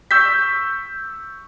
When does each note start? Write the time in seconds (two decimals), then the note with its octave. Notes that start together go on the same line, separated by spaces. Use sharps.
0.11 C#6 E6 G6 B6